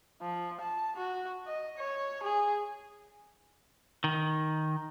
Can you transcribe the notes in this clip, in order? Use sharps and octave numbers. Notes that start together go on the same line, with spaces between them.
F3
A5
F#4
D#5
C#5
G#4
D#3